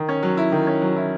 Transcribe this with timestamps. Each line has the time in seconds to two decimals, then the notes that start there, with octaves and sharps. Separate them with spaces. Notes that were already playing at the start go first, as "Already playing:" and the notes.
Already playing: D#3
0.09 C#4
0.22 F#3
0.37 E4
0.52 D#3
0.67 C#4
0.81 F#3
0.96 E4